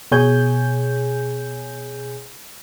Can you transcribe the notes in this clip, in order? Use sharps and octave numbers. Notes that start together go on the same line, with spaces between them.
B2 G#4 C#5 G#5 G6